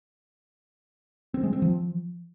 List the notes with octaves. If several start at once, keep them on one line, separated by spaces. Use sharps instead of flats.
C4
G#3
C4
F3